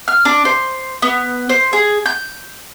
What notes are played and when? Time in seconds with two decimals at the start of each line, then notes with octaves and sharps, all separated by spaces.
0.08 F6
0.25 D4
0.45 C5
1.02 B3
1.49 C5
1.73 G#4
2.06 G6